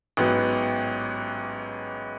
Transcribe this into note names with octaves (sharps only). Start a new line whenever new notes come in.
A1 G#2 F#3 B3